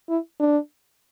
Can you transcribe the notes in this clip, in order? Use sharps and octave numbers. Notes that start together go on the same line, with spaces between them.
E4
D4